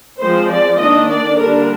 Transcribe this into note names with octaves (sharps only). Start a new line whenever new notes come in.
F3 G#3 C4 C5
D5
D#3 A#3 D4 D#5
D5
D3 G3 A#3 D4 A#4